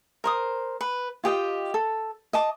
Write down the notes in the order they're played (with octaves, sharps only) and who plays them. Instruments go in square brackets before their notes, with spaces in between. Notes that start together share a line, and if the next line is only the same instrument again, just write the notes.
[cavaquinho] A#4 C5 D#6
B4
F4 G4 D#5 G5
A4
D#5 A5 D6